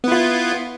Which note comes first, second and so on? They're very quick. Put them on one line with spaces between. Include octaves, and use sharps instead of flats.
B3 E4 F4